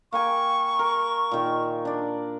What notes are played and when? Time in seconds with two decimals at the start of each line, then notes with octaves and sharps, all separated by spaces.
0.13 A#3 G5 G#5 C#6
0.79 A#4
1.32 A#2 D#3
1.85 D4 D5